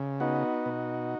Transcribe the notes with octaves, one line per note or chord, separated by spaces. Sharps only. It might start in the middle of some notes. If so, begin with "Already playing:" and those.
Already playing: C#3
B3 D#4 F#4
B2